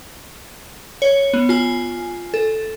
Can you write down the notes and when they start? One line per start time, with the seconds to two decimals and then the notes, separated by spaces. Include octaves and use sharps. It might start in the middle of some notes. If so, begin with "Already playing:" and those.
1.02 C#5
1.33 B3
1.49 F4 G#5
2.34 A4